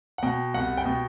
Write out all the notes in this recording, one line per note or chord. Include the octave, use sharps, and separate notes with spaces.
F#5
B2 G5
C2 F#5
G5
B2